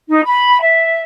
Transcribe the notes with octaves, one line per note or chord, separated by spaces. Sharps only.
D#4
B5
E5